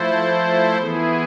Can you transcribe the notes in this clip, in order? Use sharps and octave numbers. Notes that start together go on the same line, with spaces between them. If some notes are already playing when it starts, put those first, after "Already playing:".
Already playing: F3 A3 E4 A4 C5
E3 B3 E4 G#4